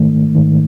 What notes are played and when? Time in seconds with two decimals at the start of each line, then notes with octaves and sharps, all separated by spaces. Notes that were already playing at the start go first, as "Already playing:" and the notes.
Already playing: G#2 D#3 A3
0.35 G#2 D#3